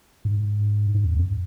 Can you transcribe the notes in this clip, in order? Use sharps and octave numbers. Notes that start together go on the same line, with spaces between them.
G#2
G#2
E2
F2